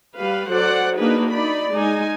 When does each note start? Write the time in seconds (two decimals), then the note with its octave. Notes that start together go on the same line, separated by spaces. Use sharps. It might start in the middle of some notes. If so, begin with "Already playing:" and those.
0.17 G3 B4 F5
0.52 F#3 A4 C5 D5 F#5
0.97 A#3 D4 D#4 F#4 G#4 B4
1.31 D#4 D5 B5
1.72 G#3 D#4 G#5